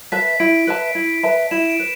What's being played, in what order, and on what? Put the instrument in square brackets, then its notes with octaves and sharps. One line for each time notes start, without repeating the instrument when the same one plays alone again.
[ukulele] B4 E5 A5 [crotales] B6
[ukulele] E4 [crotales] D7
[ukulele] B4 E5 A5
E4
B4 E5 A5
[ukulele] E4 [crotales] E7
[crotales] D7
[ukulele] B4